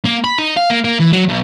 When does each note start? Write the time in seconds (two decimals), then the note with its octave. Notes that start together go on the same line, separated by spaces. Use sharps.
0.04 A#3
0.24 B5
0.39 D#4
0.57 F5
0.70 A#3
0.84 A#3
1.00 E3
1.12 F#3
1.29 B1